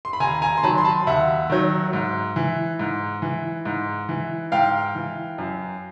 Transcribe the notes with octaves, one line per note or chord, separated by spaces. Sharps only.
C6
B5
D#2 G#5 A#5
G#5 A#5
C6
D#3 F#3 A5 B5
C6
A5 B5
D#2 E5 F#5
D#3 F#3
G#2
E3
G#2
E3
G#2
E3
G#2 F5 G5
E3
F#2